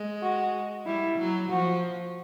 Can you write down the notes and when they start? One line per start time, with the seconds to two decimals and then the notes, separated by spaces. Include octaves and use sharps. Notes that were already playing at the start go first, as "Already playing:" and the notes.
Already playing: G#3
0.22 F#4
0.85 G3 E4
1.18 F#3
1.49 F3 F#4